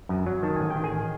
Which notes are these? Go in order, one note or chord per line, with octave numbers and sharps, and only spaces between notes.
F#2
F#3
D#3 A5
A1 G#5
G5
D#3
G#4 G#5